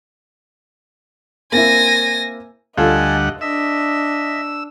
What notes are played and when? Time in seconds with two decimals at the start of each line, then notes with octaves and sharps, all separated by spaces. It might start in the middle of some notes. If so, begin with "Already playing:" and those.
1.52 A#3 C4 E4 G#5 A#6
2.77 D2 G3 F4 A4 D#5 F#5 G#5 A5
3.41 D4 D#5 E5 E6